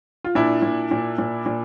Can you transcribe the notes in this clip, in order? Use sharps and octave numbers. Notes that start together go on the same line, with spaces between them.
F4
A#2 D4 E4
A#2
A#2
A#2
A#2